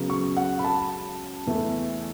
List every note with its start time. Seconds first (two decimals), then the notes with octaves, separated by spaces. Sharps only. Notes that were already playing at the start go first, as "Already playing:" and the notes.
Already playing: C#2 C#3 F#3 B3
0.10 C#6
0.37 F#5
0.59 B5
0.64 A5
1.47 E2 E3 A3